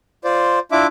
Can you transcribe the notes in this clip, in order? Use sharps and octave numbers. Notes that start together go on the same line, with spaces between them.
F4 C5 D5
D4 E4 F4 E5 D6